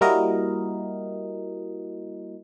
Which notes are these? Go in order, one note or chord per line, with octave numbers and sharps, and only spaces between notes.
G3 A#3 E4 F#4 A#4 D#5